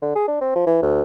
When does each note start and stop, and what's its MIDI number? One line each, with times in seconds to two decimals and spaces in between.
0.02 0.11 50
0.16 0.26 68
0.28 0.40 62
0.41 0.52 60
0.56 0.66 53
0.67 0.78 52
0.82 1.02 38